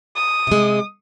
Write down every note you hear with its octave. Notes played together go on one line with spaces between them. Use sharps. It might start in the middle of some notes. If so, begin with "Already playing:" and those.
D#6
C3 G#3